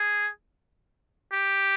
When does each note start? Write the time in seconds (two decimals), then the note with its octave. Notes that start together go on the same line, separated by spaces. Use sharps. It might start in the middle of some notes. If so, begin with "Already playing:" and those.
Already playing: G#4
1.33 G4